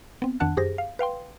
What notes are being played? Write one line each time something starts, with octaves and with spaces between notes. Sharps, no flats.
B3 C4
F2 D#3 D4 F#5 A5 F#6
F#2 G4 G#4 C5 A#6
F5
B4 F5 G5 C6